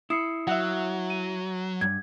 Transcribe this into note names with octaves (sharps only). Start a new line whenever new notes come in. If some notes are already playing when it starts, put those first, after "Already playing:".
E4 D#6 C7 C#7
F#3 E5 F#5
D#7
G2 G#6